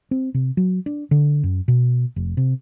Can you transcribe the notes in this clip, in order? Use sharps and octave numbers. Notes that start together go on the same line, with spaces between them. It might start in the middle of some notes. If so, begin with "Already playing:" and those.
C4
C3
F#3
D4
D3
F#2
B2
F1
C3